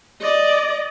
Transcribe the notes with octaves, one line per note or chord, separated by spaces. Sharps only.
D5 D#5